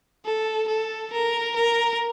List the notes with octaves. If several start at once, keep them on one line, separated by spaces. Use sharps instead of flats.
A4
A4
A#4
A#4